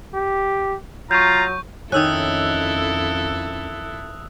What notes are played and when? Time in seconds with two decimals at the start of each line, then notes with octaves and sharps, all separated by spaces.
0.14 G4
1.11 F#3 F4 A#5 C#6 G6
1.92 F2 D#3 C#4 E4 A4 D#6 E6 F#6